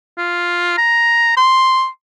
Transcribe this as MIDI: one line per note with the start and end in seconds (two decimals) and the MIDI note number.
0.18 0.76 65
0.78 1.35 82
1.37 1.87 84